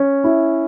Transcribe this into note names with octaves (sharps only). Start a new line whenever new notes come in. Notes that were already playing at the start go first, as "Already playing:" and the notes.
Already playing: C#4
E4